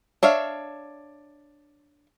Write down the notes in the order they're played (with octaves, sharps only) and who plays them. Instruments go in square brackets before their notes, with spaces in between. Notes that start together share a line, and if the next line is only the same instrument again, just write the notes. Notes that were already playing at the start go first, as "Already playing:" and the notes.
[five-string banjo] D4 C#5 E5 F5